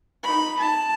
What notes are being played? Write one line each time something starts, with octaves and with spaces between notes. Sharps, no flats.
D#4 B5
A5